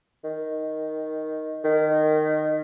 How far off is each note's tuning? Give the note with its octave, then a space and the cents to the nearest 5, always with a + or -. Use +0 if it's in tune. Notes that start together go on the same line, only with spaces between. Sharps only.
D#3 +5
D#3 -15